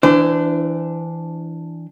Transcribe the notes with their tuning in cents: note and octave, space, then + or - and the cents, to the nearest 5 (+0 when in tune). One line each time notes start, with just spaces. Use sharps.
E3 +0 D4 +0 C5 -35